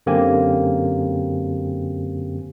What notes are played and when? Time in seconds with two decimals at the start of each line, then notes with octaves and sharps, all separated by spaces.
0.06 F#2 D3 A#3 C4 G4 G#5